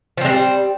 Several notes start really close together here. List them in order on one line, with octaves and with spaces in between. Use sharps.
F3 C4 G#3 G3